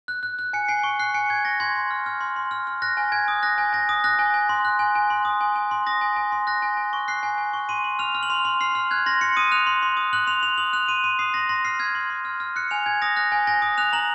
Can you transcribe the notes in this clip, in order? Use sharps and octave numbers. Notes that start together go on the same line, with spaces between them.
F#6
F#6
F#6
G#5 C#7
G#5 C7
C#6
F#6 C7
G#5 C#7
G#5 G#6
C#6 A#6
C6 G#6
C6
F6
F6
C6
C6
F6
F6
F#6 A#6
G#5
G#5 G#6
D#6
F#6 A#6
G#5
G#5 A#6
D#6
F#6 A#6
G#5
G#5
C6
F#6
G#5
G#5
C6
D#6
G#5
G#5
C6
D#6 A#6
G#5
G#5
C6
F#6 A#6
G#5
G#5
C#6
F#6 C7
G#5
G#5
C#6
C6 D#7
C6
F6 F7
F6
F#7
C6 F7
C6
F6 C7
F6
F#6 G#6
C6 A#6
C6 C#7
D#6 D#7
F#6 F7
C6
C6
D#6
F#6 F#7
C6 F7
C6 F7
D#6 F#7
F#6 F7
C6 D#7
C6 D#7
D#6 C7
C6 A#6
C6 A#6
F6 C7
F6 G#6
C6
C6
F6
F6
F#6 C#7
G#5 F7
G#5 G#6
D#6 A#6
F#6 A#6
G#5
G#5 A#6
D#6
F#6 F7
A#5 F#7